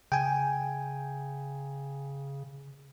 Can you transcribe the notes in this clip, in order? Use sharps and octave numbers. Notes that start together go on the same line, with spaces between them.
C#3 G5 G#5